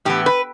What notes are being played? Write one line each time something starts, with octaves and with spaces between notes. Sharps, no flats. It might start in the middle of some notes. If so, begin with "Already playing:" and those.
A2 E3 B3 G4
B4